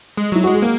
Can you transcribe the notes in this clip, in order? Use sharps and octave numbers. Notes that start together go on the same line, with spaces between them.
G#3
F#3 E4
G#3 F#4
G#4
A#3 A#4